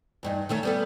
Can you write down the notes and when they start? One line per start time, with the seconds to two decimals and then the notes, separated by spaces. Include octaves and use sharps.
0.23 E2 G2 D#4
0.49 D#3 A3 C#4
0.63 G3 B3 A4